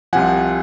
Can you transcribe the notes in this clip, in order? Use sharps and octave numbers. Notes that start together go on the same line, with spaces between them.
C2 C3 F3 F#5 G#5